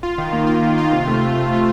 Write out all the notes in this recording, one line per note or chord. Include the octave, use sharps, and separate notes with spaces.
F4
D#3
A#3
F4
D#3
F4
C3
A3
C3
C3
A3